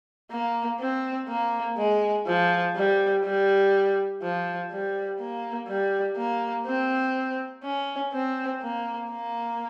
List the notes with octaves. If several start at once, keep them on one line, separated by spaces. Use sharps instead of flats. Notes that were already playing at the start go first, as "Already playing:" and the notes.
A#3
C4
A#3
G#3
F3
G3
G3
F3
G3
A#3
G3
A#3
C4
C#4
C4
A#3
A#3